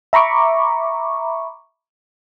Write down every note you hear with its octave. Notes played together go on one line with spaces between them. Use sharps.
E5 A#5 B5 C#6 D6